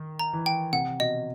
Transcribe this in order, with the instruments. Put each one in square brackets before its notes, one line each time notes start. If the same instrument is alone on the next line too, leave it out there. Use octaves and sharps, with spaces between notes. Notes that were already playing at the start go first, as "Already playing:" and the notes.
Already playing: [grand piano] D#3
[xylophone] A#5
[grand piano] E3
[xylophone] G5
[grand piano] C3 [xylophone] F#5
[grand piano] B2 [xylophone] D#5